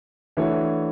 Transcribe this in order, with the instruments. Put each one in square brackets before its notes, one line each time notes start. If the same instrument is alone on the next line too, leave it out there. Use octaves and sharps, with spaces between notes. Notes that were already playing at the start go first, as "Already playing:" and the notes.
[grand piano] E3 A3 D4 F#4 C#5